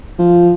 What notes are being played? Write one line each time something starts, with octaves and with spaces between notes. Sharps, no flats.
F3